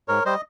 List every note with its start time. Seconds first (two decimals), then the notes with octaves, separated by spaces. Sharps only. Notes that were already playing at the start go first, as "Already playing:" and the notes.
0.08 G#2 A#4 C#5
0.25 G3 C5 D#5